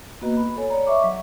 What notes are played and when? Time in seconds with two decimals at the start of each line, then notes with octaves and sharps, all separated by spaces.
0.21 A#3 B3 F#4 B4 D#5 A#5
0.37 B5
0.56 A4 C#5 G#5
0.70 C#5 D5 A#5
0.87 D#5 E5 C#6 D6
1.04 F#3